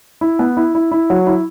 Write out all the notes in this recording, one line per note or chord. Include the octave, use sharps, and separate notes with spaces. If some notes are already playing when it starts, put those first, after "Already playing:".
E4
B3
E4
E4
E4
F#3
E4